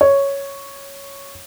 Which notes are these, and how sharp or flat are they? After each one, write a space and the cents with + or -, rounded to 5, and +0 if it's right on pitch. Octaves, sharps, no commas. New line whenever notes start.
C#5 +0